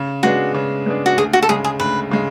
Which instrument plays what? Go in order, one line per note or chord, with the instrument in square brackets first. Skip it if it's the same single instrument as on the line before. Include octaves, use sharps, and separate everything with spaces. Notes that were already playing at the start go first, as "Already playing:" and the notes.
Already playing: [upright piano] C#3
[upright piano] G#3 B3 D4 G#4 [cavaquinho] F#4
[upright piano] C#3
G#3 B3 D4 G#4
[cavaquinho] F#4
[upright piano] D2 [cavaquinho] G#4
[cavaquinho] F#4
A4
[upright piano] C#3 G#3 [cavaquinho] G#4
[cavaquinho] G#4
[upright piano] D2 [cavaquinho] B4
[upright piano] C#3 G#3